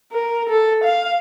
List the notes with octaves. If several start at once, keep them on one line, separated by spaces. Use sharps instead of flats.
A#4
A4
F5